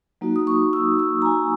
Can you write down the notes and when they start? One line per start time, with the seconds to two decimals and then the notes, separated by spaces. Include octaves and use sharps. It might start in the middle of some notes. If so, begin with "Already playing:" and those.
0.21 F#3 A#3 D#4 F#4
0.36 D#6
0.47 C#6
0.73 E6
0.99 E6
1.22 A#5
1.25 G#5